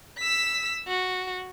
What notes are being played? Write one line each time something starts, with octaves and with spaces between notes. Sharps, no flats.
E6 B6
F#4